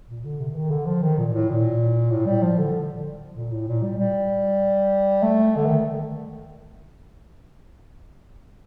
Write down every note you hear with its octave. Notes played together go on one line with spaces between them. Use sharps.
A#2
D3
C3
D3
D#3
D3
F3
D#3
A#2
A2
A#2
A2
G3
F3
D3
A#2
A2
A#2
G3
G3
A3
D3
D#3